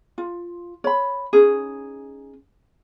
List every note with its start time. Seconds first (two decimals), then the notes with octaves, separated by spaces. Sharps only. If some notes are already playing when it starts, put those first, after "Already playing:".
0.18 F4
0.84 C#5 B5
1.33 C#4 D#4 G#4